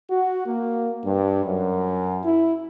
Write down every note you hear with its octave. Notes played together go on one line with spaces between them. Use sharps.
F#4
A#3
G2
F#2
E4